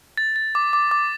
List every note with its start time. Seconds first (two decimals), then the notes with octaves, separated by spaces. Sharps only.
0.17 A6
0.36 A6
0.55 D6
0.73 D6
0.91 D6